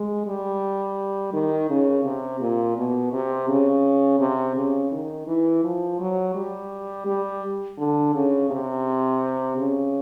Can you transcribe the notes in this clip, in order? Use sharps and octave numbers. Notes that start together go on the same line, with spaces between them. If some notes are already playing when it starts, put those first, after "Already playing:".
Already playing: G#3
G3
D#3
C#3
C3
A#2
B2
C3
C#3
C3
C#3
D#3
E3
F3
F#3
G3
G3
D3
C#3
C3
C#3